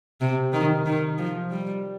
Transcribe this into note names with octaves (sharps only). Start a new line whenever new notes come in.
C3
D#3
D#3
F3
G3